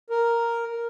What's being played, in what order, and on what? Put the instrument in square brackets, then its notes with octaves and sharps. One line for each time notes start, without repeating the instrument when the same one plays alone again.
[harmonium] A#4